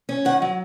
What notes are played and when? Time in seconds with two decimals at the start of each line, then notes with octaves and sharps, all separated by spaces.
0.09 C#4
0.25 D#3 F#5
0.42 F#3